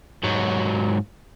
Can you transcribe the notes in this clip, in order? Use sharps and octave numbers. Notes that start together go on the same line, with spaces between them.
G#2 F#3